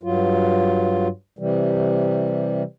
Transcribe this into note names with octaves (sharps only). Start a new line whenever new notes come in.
G2 F#3 F4
C3 E3 G3